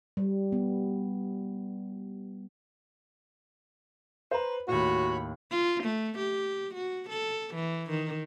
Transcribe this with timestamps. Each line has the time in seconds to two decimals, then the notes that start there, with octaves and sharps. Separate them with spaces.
0.17 G3
0.52 B3
4.31 B4 C5 A#5
4.68 D#2 A2 F#4 C#5 B5
5.51 F4
5.83 A3
6.18 G4
6.74 F#4
7.10 A4
7.54 E3
7.90 D#3